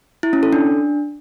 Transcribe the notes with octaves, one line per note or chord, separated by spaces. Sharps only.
E4
C#4
A4
D4